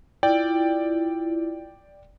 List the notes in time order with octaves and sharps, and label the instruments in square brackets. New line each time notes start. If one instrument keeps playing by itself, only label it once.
[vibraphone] E4 F4 [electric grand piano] D5 G5